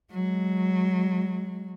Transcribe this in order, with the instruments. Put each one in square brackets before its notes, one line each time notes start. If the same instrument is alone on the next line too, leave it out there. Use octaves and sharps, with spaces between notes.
[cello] F#3 G#3